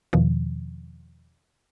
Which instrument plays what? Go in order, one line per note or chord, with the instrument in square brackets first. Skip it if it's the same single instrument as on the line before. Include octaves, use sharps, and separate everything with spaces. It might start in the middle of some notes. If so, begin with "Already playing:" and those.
[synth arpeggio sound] E2 B2 D#3 F3